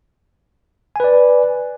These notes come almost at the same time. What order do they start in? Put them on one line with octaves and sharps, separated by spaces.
G#5 B4 D5